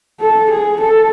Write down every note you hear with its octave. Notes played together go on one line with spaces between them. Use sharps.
A4
G#4
A4